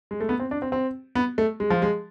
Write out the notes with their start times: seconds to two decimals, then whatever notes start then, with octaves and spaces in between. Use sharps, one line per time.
0.11 G#3
0.20 A3
0.29 B3
0.40 C4
0.51 D4
0.62 C4
0.72 C4
1.15 B3
1.38 A3
1.60 G#3
1.70 F3
1.82 G#3